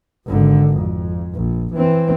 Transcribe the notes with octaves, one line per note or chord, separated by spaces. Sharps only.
G#1 D3
F2
A#1
E3 C4